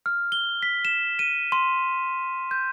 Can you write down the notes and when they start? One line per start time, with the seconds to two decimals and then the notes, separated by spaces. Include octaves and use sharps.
0.06 F6
0.32 G7
0.63 B6
0.85 E7
1.19 D#7
1.52 C6
2.51 G6